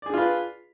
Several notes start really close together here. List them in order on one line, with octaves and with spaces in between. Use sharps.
D5 G#4 D4 F4 B4